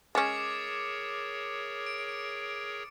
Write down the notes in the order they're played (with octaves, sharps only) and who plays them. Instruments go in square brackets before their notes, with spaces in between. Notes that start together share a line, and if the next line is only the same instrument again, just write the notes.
[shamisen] G#3 C#4 [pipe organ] G#4 A#4 C#5 [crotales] D6 A6 C#7
[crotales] D7